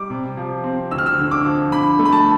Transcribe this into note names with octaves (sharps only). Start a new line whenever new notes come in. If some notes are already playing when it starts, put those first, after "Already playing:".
Already playing: G3 D6
C3
F3
C4
D2 E6
F6
E6
D3
D6
F3
D3 B5
A3
B5
A5